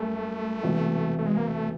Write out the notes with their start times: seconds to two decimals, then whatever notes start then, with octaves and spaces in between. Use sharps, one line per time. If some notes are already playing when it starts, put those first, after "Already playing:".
Already playing: F#2 G3 A3 A#3
0.63 E1 E2 C3
1.19 A3
1.26 G#3
1.37 A#3
1.47 A3